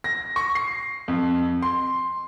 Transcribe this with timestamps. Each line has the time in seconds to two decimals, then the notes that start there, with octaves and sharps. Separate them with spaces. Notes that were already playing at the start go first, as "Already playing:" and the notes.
0.04 A#6
0.36 C#6
0.55 C7
1.08 F2
1.62 C6